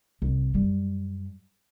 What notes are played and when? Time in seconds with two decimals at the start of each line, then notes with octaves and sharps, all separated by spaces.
0.22 C2
0.54 F#2 G3